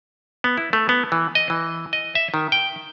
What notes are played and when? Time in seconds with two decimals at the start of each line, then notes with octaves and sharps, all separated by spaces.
0.44 B3
0.57 E4
0.73 A3
0.89 B3
1.12 E3
1.35 D#5
1.50 E3
1.93 D#5
2.15 E5
2.34 D#3
2.52 G5